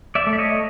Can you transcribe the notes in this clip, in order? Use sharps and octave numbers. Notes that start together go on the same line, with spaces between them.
D5 E5
A3
E5
C#5 D#5